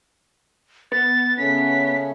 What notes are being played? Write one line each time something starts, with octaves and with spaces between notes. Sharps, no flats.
B3 A6
C#3 A3 C#4 B6